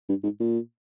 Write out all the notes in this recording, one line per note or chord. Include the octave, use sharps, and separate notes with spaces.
G2
G#2
A#2